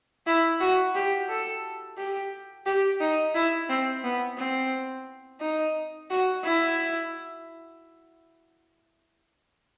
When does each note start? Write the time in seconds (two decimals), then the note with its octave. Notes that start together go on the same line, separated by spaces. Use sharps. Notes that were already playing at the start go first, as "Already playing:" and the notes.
0.27 E4
0.60 F#4
0.95 G4
1.29 A4
1.98 G4
2.66 G4
3.00 D#4
3.35 E4
3.70 C4
4.04 B3
4.38 C4
5.40 D#4
6.10 F#4
6.44 E4